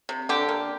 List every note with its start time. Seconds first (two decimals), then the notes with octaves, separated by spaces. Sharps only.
0.09 C3
0.29 D3 G4
0.49 A#3